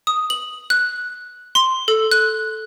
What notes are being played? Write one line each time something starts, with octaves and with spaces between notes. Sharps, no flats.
D#6
F#7
F#6
C6
A4
F#6